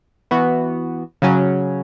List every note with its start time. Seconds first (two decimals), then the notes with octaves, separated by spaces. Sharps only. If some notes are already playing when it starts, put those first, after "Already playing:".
0.31 E3 B3 F#4
1.22 C#3 F#3 C#4